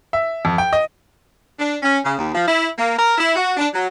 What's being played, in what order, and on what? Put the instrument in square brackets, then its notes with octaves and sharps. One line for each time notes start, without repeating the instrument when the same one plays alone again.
[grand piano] E5
F2
G5
D#5
[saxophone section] D4
C#4
C#3
D#2
F3
E4
A#3
A#4
E4
F#4
D4
F#3